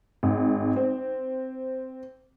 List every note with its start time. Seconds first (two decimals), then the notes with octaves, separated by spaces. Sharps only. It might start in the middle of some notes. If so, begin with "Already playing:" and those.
0.23 G#1
0.76 C4